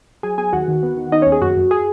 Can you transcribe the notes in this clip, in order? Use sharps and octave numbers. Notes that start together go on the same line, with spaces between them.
F#3 G#4 G#5
B3 G#4 G#5
D#2 F#4 F#5
D#3
B3
D#3
B3 D#4 D#5
D#2 C#4 C#5
G#4
F#2 F#4
F#2
G#4